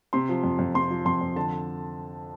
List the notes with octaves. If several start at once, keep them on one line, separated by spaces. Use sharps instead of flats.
C3 C6
F3
F2
F2
C3 C6
F3
F2 C6
F2
D3 A5